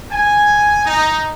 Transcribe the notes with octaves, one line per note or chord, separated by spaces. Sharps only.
G#5
D#4